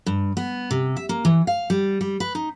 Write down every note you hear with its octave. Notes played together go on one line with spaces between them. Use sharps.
G2
B3
C3
E5
A#3
E3
F5
G3
G3
B4
D#4